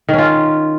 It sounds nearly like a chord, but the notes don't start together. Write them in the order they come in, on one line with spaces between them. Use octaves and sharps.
D#3 C#4 F4